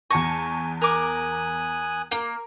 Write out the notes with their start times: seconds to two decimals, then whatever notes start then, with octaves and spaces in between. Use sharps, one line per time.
0.11 E2 G#5 A5 C#6 A#6
0.82 A#4 G#5 D6 D#6 F#6
2.11 A#3 A#4